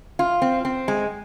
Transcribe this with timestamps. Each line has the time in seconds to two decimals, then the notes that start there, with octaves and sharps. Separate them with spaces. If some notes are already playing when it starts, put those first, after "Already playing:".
0.19 F4
0.42 C4
0.65 C4
0.88 G#3